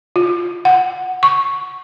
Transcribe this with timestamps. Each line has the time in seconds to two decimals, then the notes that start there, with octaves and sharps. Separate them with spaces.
0.16 F4
0.65 F#5
1.23 C#6